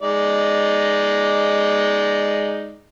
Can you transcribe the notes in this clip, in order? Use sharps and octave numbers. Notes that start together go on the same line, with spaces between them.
G#3 D#4 D5